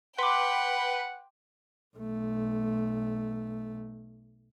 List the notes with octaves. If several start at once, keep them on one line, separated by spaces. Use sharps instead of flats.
B4 F#5 G5 C6 D6
B1 A3